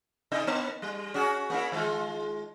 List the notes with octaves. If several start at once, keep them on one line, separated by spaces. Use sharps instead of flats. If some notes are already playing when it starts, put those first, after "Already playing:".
C3 D#4 D#5
A#3
G3
C#4 F#4 G#4
A#3 C#4 E4
D#3 G#3 F4